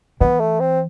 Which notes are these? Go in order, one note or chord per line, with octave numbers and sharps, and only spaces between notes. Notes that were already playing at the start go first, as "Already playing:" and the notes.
E3 B3
A3
C4